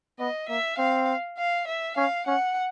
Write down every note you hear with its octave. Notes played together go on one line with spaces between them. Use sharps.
B3 D#5
A#3 E5
C4 F5
F5
E5
C#4 F5
C#4 F#5